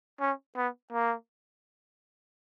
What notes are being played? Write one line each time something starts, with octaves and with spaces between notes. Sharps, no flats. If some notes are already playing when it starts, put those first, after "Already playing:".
C#4
B3
A#3